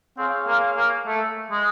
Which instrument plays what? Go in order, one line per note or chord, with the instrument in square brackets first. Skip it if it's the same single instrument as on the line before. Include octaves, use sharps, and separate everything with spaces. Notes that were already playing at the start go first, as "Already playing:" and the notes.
[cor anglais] C4 [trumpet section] F4 G#4 C#5 F5
[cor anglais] A#3
A#3
A3
G#3